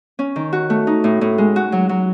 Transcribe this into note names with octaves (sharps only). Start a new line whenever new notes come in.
C#4
D#3
F#4
A3
D#4
A2
A2
G#3
F#4
F#3
F#3